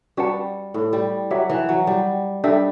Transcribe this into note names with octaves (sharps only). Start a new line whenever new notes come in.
G3 C#4 F#4 B4 F#5 A5
A2
G3
F#3 G4 C#5 E5 G5
E3
F#3
G3
G3 D4 A4 E5